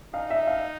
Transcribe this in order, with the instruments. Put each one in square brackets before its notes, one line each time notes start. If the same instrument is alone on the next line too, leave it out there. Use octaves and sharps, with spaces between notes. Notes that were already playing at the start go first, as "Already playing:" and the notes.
[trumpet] D#4 [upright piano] F5
[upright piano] E5
F5